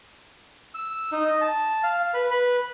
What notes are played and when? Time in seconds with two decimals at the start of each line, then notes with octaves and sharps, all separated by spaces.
0.74 E6
1.12 D#4
1.25 D#5
1.41 A5
1.84 F5
2.14 B4
2.31 B4